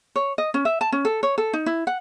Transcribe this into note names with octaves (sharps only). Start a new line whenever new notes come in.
C#5
D#5
C#4
E5
A5
C#4
A4
C#5
A4
D#4
E4
F#5